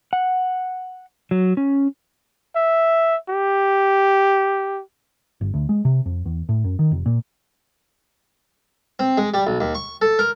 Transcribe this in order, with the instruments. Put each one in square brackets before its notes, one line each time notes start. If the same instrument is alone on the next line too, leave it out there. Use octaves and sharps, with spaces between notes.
[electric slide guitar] F#5
F#3
C#4
[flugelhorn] E5
G4
[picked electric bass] G1
D2
G#3
C3
F2
E2
A2
F#2
D#3
F1
A#2
[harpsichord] C4
G#3
G3
B1
D#2
C#6
A4
A#4